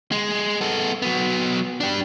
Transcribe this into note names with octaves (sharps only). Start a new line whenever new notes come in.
G#3
B3 A4
F#3 B3
D4 G4